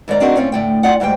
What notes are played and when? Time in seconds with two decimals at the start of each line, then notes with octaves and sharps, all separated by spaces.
0.08 D#2 G#2 A#4 D5 A#5
0.20 C4 D4 D#4 F#4 G#4 A#4
0.36 A2 C4 C#4 F4
0.52 A2 D3 G5
0.83 F4 D5 F#5
1.00 D2 G#2 G3 C5 G5